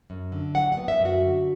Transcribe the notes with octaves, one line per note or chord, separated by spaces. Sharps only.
F#2
D3
F#3 F#5
F#5
B3
E5
F#2
F#4
D3